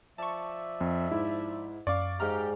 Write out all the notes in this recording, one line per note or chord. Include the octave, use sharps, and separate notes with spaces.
F3 D5 E5 A5 C#6
F2
G#2 E4
F#2 D5 F5 C#6 D6
G#2 G4 F5 A#5 F6